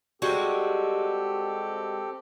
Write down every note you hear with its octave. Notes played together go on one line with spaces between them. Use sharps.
G3 G#3 C4 F#4 G4 A4